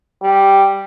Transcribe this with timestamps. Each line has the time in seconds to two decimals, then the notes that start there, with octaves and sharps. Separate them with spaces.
0.22 G3